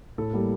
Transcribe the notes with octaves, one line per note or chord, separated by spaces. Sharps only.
A2 A4
G3 A#3